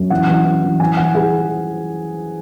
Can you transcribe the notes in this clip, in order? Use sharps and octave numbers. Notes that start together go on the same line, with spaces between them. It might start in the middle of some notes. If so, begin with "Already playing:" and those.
Already playing: F#2
E3 F#5
E3
E3
E3
E3 G#5
E3 F#5
E3 G#4